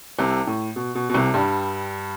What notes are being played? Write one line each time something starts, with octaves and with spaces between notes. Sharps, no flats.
C2 C3
A2
B2
B2
B2
C2 C3
G2 G3